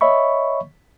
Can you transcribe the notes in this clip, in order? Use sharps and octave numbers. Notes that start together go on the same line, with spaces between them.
C#5 D#5 E5 B5 C#6